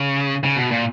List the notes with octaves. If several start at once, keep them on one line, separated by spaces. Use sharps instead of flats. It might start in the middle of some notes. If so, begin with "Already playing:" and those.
Already playing: C#3
C#3
B2
A#2